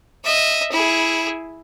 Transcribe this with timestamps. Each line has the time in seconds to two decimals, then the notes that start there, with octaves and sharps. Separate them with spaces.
0.24 D#5 E5
0.72 E4 G#4